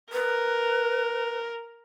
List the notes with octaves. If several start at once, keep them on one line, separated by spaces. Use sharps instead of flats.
A#4 B4